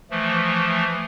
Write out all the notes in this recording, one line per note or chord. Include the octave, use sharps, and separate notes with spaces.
E3 F3 A3